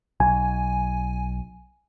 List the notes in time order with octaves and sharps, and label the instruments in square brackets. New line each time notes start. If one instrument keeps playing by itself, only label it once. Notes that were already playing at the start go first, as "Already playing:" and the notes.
[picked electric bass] B1 [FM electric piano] G#5